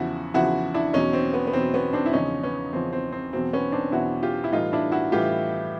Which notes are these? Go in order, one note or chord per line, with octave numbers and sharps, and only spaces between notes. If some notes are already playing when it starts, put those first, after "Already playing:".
Already playing: E2 C#3 F3 E4 F#4
E2 C#3 F3 E4 F#4
D4 E4
E2 B2 F#3 C#4 D#4
C4
B3
B3
E2 B2 F#3 C4
B3 C#4
C4 D4
E4
E2 C#3 F3 C#4 D#4
B3 C#4
E2 C#3 F3 C4
C4
C4
E2 B2 F#3 C4
B3 C#4
C4 D4
E2 B2 F#3 E4 F#4
F4 G4
E4
A2 E3 G3 D#4 F4
D4 E4
E4 F#4
A2 E3 G3 F4 G4